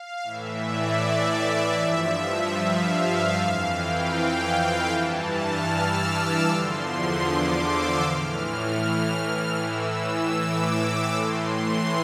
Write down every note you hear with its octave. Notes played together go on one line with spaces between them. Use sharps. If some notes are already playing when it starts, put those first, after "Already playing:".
Already playing: F5
A2 E3 E5
D5
E5
E5
G2 F3 E5
E5
F5
F2 E3
G5
F5
G5
G2 E3 A5
F6
E6
D6
E2 D3 F3 C6
D6
E6
A2 E3 F6
F6
F6
A2 E3 E6
E6
D6
E6
A2 E3 C6